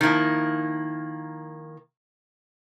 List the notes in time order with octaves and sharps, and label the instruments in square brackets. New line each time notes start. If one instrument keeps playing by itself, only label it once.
[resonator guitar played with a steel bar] D#3 F3 A#3 E4